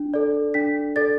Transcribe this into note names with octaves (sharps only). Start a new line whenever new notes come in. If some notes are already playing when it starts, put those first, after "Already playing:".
Already playing: D4
A4 D5
D4 B6
A4 D5 A6